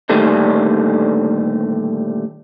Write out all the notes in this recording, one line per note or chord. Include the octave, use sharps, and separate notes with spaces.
A#2 D3 D#3 G3 A3 D4